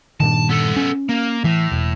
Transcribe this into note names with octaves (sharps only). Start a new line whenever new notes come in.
G2 A#2 D#3 A5
B3 A4
C#4
A#3
A2 E3
E1